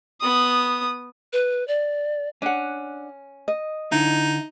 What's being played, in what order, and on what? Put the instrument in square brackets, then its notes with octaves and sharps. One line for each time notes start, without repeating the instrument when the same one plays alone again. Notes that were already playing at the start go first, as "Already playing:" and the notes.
[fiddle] B3 D#6
[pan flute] B4
D5
[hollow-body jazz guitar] C#4 [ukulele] D4 F#5
[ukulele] D#5
[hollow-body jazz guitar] D3 E4 [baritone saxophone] D#4